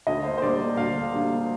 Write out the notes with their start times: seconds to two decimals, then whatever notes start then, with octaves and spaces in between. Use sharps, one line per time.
0.07 D2 D#5
0.25 C5
0.38 C5
0.42 D3 G3 A#3 D5
0.77 D2 F5
1.12 D3 G3 A#3